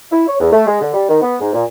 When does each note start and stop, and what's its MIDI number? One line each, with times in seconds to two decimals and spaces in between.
0.12 0.24 64
0.28 0.36 73
0.40 0.49 40
0.53 0.65 57
0.67 0.79 56
0.81 0.91 50
0.94 1.07 55
1.09 1.22 51
1.22 1.36 59
1.41 1.51 44
1.54 1.63 46